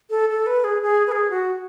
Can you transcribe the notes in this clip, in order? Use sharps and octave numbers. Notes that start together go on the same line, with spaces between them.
A4
A4
B4
G#4
G#4
B4
G#4
F#4